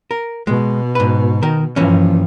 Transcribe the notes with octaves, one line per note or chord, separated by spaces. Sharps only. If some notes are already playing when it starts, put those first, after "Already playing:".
A#4
B2 G#3
G#2 B4
D#3 A#4
G2 E3 F3 A#3 C#4